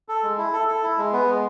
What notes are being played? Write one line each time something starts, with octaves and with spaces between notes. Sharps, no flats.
A4
G#3
E4
A4
A4
E4
G#3
B3
G#3